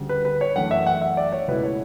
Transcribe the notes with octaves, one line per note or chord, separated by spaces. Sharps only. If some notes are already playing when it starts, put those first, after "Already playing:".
Already playing: D2 C#3 G3
B4
B4
C#5
F#2 E3 A3 D4 F#5
E5
F#5
E5
D5
C#5
C#2 B2 A3 E4 B4
C#5